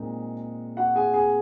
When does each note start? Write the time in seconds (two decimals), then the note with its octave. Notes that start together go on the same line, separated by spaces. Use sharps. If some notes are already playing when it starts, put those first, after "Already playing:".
Already playing: A#2 G#3 C4 D#4
0.77 F#4 F#5
0.95 G#4 G#5
1.14 G#4 G#5